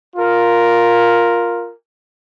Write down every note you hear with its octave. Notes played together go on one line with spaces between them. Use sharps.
F4 A#4